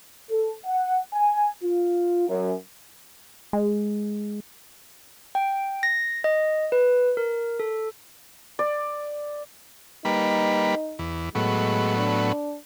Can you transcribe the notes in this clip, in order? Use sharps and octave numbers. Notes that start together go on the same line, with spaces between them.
A4
F#5
G#5
F4
F#2
G#3
G5
A#6
D#5
B4
A#4
A4
D5
G3 A#3 D#4 B4
E2
A2 F#3 G#3 B3
D4